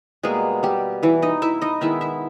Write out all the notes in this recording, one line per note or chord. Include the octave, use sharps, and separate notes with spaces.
B2 G3 G#3 A#3 G#4
G3 G4
E3 E4
D#4 D#5
E4 E5
D#4 D#5
D#3 G#3 B3 E4 E5
E4 E5